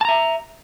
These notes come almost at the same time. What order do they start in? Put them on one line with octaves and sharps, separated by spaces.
A5 A#5 E5